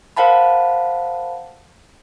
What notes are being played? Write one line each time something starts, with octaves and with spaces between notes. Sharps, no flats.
A#4 C5 F5 F#5 A5 B5